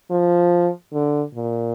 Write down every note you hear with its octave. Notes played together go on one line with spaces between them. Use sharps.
F3
D3
A#2